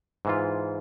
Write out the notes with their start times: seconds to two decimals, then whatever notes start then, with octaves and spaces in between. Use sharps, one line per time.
0.25 G#2 E3 F4